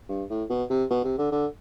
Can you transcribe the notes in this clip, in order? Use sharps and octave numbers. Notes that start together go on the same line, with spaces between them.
G2
A2
B2
C3
B2
C3
D3
D3